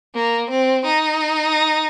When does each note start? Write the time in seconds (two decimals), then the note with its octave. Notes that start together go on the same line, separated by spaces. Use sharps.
0.14 A#3
0.50 C4
0.85 D#4